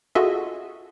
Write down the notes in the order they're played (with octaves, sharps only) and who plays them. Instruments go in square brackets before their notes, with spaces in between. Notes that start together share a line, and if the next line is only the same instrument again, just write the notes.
[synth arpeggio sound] F4 F#4 G#4 A4 D#5 E5